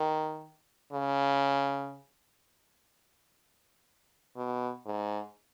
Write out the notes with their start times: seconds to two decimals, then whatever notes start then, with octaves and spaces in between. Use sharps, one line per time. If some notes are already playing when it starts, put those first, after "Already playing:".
Already playing: D#3
0.92 C#3
4.36 B2
4.86 G#2